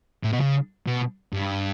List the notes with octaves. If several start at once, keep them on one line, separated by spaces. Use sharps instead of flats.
A2
B2
C#3
B2
G2